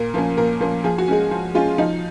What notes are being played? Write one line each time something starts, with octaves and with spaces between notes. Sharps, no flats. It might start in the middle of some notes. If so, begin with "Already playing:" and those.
Already playing: A#2 A#4
F3 A#3 C#4
A#2 A#4
F3 A#3 C#4
F3 G#4
F#4
G#3 C#4 G#4
F3
G#3 C#4 F4
F3 D#4